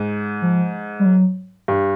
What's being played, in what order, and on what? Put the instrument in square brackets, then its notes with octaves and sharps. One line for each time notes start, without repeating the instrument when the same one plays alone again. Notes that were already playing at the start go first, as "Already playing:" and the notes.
Already playing: [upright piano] G#2
[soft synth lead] F3
G3
F#3
[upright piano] G2